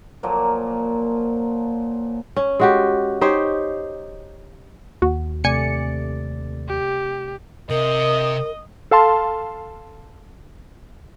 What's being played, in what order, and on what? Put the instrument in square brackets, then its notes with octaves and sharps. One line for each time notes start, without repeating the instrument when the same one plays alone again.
[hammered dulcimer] A#2 F3 F#3 A#3
[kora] C#4
G#3 F#4 G4
D#4 G4 C5 C#5
[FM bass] D#2 [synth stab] F#4
[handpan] C3 A3 D5 [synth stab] G#5 C#7
[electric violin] G4
[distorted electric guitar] C3 [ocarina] A#4 [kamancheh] D#5
[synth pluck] A4 F5 A5 C6